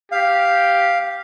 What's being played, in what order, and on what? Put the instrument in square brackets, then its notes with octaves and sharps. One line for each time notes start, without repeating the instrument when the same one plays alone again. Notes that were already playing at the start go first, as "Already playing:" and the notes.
[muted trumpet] G4 [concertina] F5